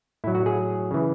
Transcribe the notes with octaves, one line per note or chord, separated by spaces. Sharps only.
A2 F#3 E4
F#4
G#4
C#3 E3